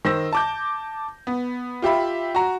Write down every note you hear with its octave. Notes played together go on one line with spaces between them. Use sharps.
D#3 C5 E6 A#6
A5 D6 G6
B3
F4 G4 E5 B5
F#4 A#5